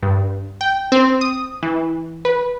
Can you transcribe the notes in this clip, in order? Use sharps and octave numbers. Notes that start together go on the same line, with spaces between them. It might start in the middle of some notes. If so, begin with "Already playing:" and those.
G2
G5
C4
D#6
E3
B4